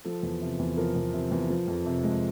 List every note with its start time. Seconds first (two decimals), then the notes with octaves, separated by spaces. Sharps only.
0.05 F3 A4
0.23 E2
0.41 C3
0.59 E2
0.77 F3 A#4
0.95 E2
1.13 C3
1.32 E2
1.50 F3
1.68 F2
1.86 C3
2.03 G#3